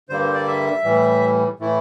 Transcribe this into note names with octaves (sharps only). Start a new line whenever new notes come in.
G2 D3 G3 A#3 C5
C5
D5
E5
A2 E3 G3
A2 E3 A3 E4